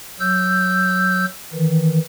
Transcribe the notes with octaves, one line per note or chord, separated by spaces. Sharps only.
F#3 E6 G6
D#3 E3